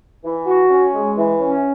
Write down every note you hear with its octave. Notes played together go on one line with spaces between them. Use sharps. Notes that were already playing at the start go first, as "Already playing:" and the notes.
E3
F#4
C#4
G#3
E3
C#4